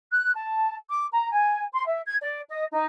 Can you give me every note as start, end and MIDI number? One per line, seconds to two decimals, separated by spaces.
0.11 0.34 90
0.35 0.77 81
0.89 1.06 86
1.13 1.30 82
1.32 1.65 80
1.73 1.85 84
1.87 2.00 76
2.04 2.16 92
2.22 2.40 74
2.50 2.64 75
2.72 2.86 63